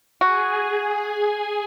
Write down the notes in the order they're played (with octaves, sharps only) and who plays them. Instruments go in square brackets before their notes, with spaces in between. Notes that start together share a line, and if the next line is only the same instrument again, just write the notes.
[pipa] F#4 [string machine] G#4 G#5